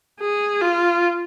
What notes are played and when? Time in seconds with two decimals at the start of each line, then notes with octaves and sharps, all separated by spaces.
0.20 G#4
0.61 F4